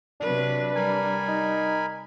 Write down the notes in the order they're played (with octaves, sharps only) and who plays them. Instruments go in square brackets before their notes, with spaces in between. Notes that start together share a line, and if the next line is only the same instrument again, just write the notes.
[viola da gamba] C3 F#3 B4 [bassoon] D4
[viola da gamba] G3 [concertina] A#4 G#5 B5
[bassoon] D#4